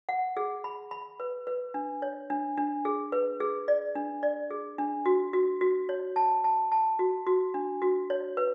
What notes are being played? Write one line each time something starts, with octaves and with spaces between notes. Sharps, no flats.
F#5
G#4
B5
B5
B4
B4
D4
C#5
D4
D4
G#4
B4
G#4
D5
D4
D5
G#4
D4
F#4
F#4
F#4
C#5
A5
A5
A5
F#4
F#4
D4
F#4
C#5
B4